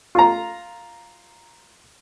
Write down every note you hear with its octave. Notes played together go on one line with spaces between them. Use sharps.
F4 A#5